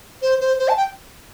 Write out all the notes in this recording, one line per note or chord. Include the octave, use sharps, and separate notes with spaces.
C5
C5
C5
A5
G5